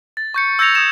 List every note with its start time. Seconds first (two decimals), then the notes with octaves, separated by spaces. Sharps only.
0.17 A6
0.34 C#6 G6 C#7
0.59 E6 G6 G#6 A#6 C#7 F7
0.75 D#6 G#6 E7